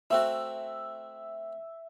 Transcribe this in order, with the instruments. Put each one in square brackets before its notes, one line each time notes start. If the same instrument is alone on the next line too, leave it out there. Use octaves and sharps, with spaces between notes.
[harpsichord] A3 C4 F#4 [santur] E5